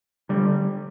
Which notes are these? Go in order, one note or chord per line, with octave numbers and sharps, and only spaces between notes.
D3 G3